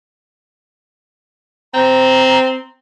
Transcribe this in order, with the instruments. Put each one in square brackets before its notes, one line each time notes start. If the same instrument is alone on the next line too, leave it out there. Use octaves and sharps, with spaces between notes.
[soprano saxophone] C4 [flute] A#5